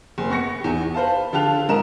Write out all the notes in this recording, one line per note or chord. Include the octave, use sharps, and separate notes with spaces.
F#1
B3 C#6 A#6 C#7
E2 G4
B4 C5 F5 A5
D3 F4 G4 A5 F#6 F7
G#2 A#4 D#5 A#5 E7